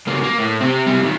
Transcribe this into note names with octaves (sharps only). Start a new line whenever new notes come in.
C#2 A#3
A#3
A2
C3 C4
C3 G3
A#2 D#3